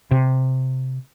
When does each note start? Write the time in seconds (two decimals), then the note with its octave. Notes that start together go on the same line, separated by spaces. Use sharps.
0.11 C3